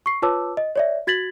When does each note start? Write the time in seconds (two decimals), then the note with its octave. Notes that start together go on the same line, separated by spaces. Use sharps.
0.06 C#6 C7
0.22 F4 B4 C#5 A5 D6 E6
0.57 D#5
0.76 C#5 D5 E5
1.07 F#4 G#6 A6 B6 F#7